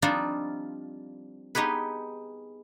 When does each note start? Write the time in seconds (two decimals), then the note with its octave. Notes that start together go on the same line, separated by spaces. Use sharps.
0.02 F3 G3 C4 D4 D#4 F4
1.55 B3 D#4 G4 G#4 B4